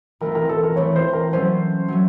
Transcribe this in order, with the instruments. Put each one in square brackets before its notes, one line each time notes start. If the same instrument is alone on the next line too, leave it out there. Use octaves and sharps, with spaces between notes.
[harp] E3 A3 C4 [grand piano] A#4
[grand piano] A#4
A4
A#4
[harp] E3 A3 C4 [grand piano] C#5
[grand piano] C5
A#4
[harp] F#3 A3 C#4 [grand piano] C5
[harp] F#3 A3 C#4